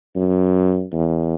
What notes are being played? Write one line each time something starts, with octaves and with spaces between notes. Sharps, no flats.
F#2
E2